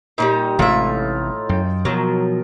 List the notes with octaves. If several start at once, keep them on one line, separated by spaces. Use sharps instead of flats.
A#2 D#3 G3 D#4
A1 A2 C3 G#3 F4 E5
F#2 G5
B2 F3 F#3 A#4